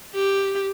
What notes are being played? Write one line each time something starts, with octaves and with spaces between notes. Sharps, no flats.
G4